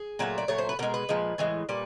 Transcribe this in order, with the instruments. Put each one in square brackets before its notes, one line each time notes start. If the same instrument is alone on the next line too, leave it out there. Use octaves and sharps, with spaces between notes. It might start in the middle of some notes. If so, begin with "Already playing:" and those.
Already playing: [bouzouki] G#4
A#2 F#3 A3
D5
A#2 F#3 A3 C#5
C5
B4
B2 G#3 A#4
B4
A#2 F3 G#3
A2 E3 G#3
A#2 G3 B4